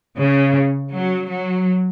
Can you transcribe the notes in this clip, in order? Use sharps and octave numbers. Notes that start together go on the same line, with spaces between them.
C#3
F#3
F#3